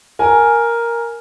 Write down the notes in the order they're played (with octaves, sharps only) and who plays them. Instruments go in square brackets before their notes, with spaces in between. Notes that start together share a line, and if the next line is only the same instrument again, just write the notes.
[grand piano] A#4 G#5